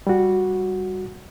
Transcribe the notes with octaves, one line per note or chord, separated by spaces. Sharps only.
G3 F#4